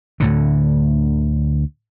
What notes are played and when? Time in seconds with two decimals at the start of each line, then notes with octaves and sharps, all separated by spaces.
0.20 D2 A2 D3